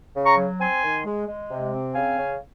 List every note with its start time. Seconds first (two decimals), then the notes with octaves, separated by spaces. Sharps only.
0.15 C#3
0.26 A#5 C#6
0.37 F#3
0.60 C4 G#5 C6
0.83 D#3
1.05 G#3
1.27 G#3
1.50 C3
1.72 C4
1.95 C#3 F5 G#5
2.17 C#3